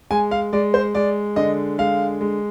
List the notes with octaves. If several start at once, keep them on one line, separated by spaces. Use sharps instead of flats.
G#3 G#5
F5
G#3 D5
C5
G#3 D5
D3 D#5
G#3 F5
G#3